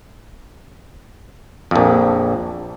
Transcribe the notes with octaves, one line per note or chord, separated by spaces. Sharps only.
A#1 F2